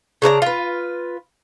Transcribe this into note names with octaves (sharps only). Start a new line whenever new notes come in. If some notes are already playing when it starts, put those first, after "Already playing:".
C#3 D4 B4 A#5
F4 B4